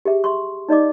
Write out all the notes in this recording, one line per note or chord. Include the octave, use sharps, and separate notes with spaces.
G4 G#4 E5
E5 C6 C#6
D#4 D5 D#5 D6